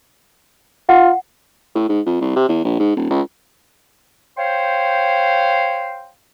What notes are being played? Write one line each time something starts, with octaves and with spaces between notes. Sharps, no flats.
F4 F#5
A2
G#2
F2
C2
C3
E2
A#1
G#2
D#1
C#2
C5 C#5 F5 G5 C6